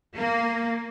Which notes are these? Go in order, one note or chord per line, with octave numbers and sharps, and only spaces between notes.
A#3